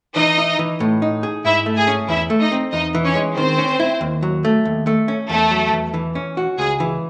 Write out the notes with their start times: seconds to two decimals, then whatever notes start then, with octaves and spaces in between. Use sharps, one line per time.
0.16 E3 D#4 D#5
0.38 E4
0.59 E3
0.80 A2
1.02 D#4
1.23 G#4
1.44 G#2 E4 E5
1.66 A3
1.76 G#4 G#5
1.87 C#4
2.09 E2 E4 E5
2.30 A3
2.40 D#4 D#5
2.52 C4
2.72 E2 D#4 D#5
2.95 E3
3.05 C#4 C#5
3.15 G#3
3.37 D#3 C4 C5
3.58 C#4
3.80 E4
4.01 D#2
4.23 F#3
4.45 A3
4.65 D#2
4.87 A3
5.08 C#4
5.29 E2 A3 A4
5.51 F#3
5.72 E2
5.94 E3
6.15 C#4
6.37 F#4
6.58 C#2 G#4
6.80 E3